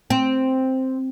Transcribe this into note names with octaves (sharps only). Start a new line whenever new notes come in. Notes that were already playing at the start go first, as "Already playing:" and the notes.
C4